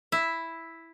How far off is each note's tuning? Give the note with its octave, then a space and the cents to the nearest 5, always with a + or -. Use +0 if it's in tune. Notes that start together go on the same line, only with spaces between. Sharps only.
E4 +0 E5 +0